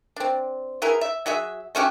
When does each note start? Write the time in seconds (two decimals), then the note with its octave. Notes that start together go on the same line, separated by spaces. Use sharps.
0.16 C4 D4
0.82 B3 E4 G#4 A#4
1.01 E5
1.26 F#3 F#4 G#4 E5
1.75 A3 C#4 F#4 G4